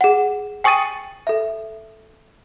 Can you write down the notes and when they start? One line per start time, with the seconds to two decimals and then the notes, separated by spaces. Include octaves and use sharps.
0.01 G#4 F#5
0.64 G5 G#5 C#6 D#6 A6 D#7
1.27 A4 E5